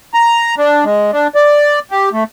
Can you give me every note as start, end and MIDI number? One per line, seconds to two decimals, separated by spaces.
0.14 0.55 82
0.58 0.84 62
0.84 1.11 56
1.13 1.27 62
1.35 1.79 74
1.91 2.09 67
2.13 2.24 57